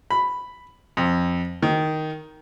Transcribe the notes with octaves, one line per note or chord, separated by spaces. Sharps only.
B5
F2
D#3